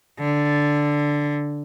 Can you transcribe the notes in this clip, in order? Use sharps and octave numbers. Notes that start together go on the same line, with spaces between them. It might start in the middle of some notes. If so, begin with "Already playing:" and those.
D3